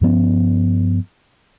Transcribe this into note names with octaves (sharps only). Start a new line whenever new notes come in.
G2 F3 B3 C#4